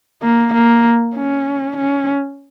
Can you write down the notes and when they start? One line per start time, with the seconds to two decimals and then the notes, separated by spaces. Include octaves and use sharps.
0.23 A#3
0.54 A#3
1.15 C#4
1.77 C#4